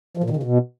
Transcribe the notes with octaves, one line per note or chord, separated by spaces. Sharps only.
F3
A#2
D#3
C#3
B2